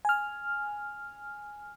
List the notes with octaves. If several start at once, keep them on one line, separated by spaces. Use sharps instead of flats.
G#5 F6